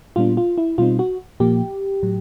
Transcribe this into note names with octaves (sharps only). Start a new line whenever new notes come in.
A#2 G3 B3 D4 F4
F4
E4
B2 G3 C4 D#4 F4
F#4
A#2 F3 A#3 G4
A2 F#3